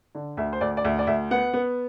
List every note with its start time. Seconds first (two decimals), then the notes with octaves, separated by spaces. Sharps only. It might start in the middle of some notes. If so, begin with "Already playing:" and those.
0.15 D3
0.37 D2 E5
0.53 C5
0.61 D2 D5
0.77 D5
0.84 D2 E5
0.99 D5
1.07 D2 E5
1.31 B3 F#5
1.54 B3